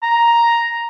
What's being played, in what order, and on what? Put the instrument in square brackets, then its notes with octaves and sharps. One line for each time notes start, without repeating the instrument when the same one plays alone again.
[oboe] A#5